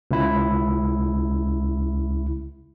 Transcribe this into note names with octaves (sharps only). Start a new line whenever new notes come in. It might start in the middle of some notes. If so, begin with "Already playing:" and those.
C#2 E4